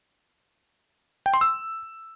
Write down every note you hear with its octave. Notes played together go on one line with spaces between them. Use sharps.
G5
C6
E6